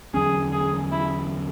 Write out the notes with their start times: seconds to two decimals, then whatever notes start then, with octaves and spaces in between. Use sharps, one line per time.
0.14 E2 D3 F#3 C#4 G#4
0.52 G#4
0.92 E4